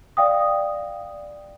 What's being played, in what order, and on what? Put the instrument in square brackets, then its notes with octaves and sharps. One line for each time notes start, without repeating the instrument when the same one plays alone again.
[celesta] D5 F5 G5 D#6